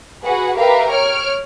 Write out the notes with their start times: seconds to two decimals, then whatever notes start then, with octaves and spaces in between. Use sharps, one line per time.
0.24 F#4 G#4 B4 F#5
0.57 G4 A#4 B4 E5 F5
0.89 C#5 F6 D7